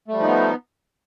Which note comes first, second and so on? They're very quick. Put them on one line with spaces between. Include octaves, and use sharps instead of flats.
A3 G3 F3 D#4 B3